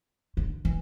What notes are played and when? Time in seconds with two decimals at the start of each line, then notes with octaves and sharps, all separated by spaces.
0.37 D3
0.65 E3